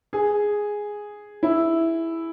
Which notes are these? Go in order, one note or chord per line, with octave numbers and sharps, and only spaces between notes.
G#4
E4